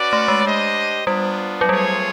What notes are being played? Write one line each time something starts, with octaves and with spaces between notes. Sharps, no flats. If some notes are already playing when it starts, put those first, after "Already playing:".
Already playing: C#4 F#4 B4 D5
A3
G#3
D4 G4 C5 D#5
G3 B3 D4 F4
F#3
G3 A3 C4 F4 G#4 C#5